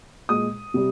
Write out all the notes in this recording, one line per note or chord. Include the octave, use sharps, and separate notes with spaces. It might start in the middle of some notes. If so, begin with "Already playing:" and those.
A#2 G#3 D#6
C3 G3